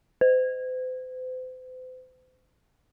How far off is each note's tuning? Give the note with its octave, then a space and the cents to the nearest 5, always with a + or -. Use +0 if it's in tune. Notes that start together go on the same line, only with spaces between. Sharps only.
C5 -40